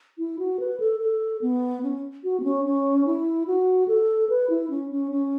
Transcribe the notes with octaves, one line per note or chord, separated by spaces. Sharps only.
E4
F#4
B4
A4
A4
B3
C#4
F#4
B3
C#4
C#4
E4
F#4
A4
B4
E4
C#4
C#4
C#4